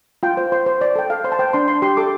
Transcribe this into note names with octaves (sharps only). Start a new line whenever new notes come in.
F4 G5
C5
C5 C6
C5
C5 D5
A4 G5
A4 F5
C5 C6
A5
C5 G5
D4 C6
D4 C6
G4 C6
A4 D6